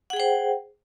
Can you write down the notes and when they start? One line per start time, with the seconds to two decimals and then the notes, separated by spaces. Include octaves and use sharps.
0.10 F#5
0.13 G#4
0.16 G5
0.20 C5